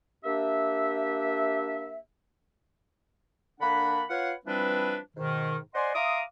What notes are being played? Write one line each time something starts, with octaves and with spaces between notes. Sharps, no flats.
A#3 D4 G4 E5
D3 A#3 D4 F#5 B5
F4 B4 C#5 F5 F#5
E3 F3 G3 C4 D4 B4
G#2 B2 D#3
C5 D5 D#5 F#5 G#5 C6
E5 F5 A#5 C6 D6 D#6